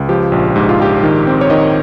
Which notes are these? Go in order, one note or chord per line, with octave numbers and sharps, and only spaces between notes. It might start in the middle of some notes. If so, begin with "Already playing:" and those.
Already playing: C#2
F3 G4
A#1
G#2 G4
F4
A#1 G4
D#3
C4
C#5
D#3 D#5